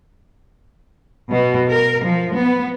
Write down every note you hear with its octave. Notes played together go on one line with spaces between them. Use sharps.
B2
A#4
F3
B3